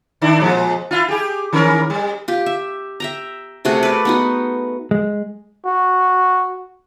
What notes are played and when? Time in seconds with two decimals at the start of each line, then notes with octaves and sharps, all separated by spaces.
0.22 D#3 D4 E4
0.38 A#2 F3 G#3
0.91 E4 F4
1.08 G4 G#4
1.53 D#3 C#4 A#4
1.90 G3
2.28 F4 G4
2.46 E5
3.00 E5 G5 A#5
3.65 C3 A3 F#4 G#4
3.83 B4 D5
4.05 B3 D#4 F#4
4.91 G#3
5.66 F#4